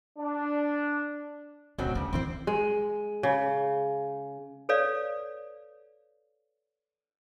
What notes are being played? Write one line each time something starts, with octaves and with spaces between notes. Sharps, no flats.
D4
D1 F2 B2 F#3 C4
G2 C#3 C4
A1 E3 C4 E4 C5
G#3
C#3
A4 B4 C#5 D5 F5